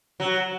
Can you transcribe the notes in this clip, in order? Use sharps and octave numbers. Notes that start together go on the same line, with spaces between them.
F#3